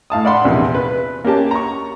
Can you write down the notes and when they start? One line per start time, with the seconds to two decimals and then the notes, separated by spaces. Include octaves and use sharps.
0.10 A2 F5 A5 D#6
0.25 D5 F5 F#5 B5 C6
0.45 A#1 E2 C3
0.75 B4
1.25 A#3 C#4 G4 A5
1.51 A#5 C#6